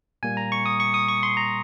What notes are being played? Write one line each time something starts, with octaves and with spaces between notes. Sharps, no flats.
A#2 G3 A#3 G#5
A#5
C#6
D#6
C#6
D#6
C#6
C6
A#5